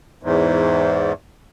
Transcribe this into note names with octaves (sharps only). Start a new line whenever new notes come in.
E2 G#2